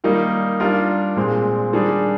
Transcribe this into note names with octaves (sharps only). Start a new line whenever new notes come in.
D#3 G3 A#3 D#4
G3 D4 F4 A#4
A#2 G#3 C4
D#3 G3 D4 G#4